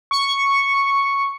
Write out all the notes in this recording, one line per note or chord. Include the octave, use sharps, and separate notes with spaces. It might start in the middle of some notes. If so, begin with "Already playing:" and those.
C#6